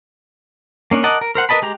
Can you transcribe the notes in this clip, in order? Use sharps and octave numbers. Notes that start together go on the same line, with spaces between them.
A#3 C#4 D4
A#4 D5 D#5 F#5 A5
A#4
A#4 C5 F#5
A#4 B4 D#5 A5 B5
G#3 G4 A#5